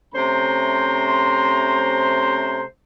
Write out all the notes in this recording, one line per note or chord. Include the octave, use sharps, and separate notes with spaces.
C3 A3 C#4 C5 A#5 C6